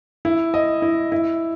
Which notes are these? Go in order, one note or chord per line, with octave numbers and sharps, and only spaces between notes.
E4
D#5
E4
E4